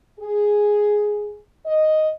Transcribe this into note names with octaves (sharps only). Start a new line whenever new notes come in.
G#4
D#5